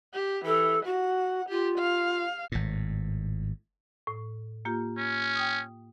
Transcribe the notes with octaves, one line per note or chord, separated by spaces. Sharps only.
G4
E3 A4
F#4 F#5
F4 G4
F5
G#1 A2
A2
A#3 F4 G4
C#4
G5 D#6